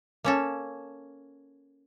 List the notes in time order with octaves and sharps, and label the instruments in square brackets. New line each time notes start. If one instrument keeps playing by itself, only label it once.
[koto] A#3 C#4 A4